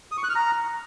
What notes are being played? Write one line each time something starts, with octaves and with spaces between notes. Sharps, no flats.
D#6
C#6
F#6
F6
A#5